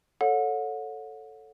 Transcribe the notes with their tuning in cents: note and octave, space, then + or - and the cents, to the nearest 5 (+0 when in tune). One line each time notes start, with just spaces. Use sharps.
A4 +0 C#5 +0 F#5 -35